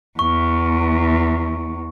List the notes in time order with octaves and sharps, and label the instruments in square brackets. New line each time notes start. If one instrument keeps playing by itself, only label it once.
[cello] E2 [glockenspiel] C#6